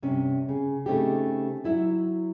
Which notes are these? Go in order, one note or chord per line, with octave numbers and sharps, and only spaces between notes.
G2 C3 C#4
C#3
C#3 A3 C4 D#4 G4
F#3 E4 E5